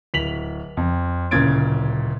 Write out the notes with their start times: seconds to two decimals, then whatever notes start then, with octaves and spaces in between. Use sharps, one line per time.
0.14 D1 B6 F7 F#7
0.77 F2
1.31 D1 A#2 C#3 G#6 A6 D7